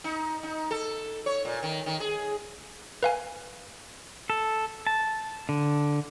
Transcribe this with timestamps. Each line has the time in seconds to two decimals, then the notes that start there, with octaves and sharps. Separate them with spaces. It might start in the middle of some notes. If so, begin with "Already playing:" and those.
0.04 D#4
0.43 D#4
0.71 A4
1.26 C#5
1.45 A#2
1.63 D#3
1.86 D#3
2.00 G#4
3.03 B4 F5 G#5
4.30 A4
4.87 A5
5.49 D3